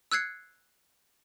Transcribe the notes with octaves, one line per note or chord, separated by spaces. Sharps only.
E6 F#6 G#6 C7 C#7